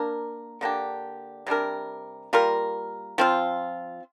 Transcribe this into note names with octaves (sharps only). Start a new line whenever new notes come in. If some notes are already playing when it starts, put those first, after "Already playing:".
Already playing: A#3 D4 A#4
D3 A#3 D4 G4
C3 G3 D4 A#4
G3 A#3 F4 A#4
F3 C4 F4